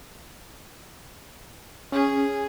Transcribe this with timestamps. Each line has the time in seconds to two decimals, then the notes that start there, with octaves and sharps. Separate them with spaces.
1.92 C#4 G#4